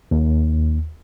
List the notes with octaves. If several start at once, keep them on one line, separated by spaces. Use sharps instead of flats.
D#2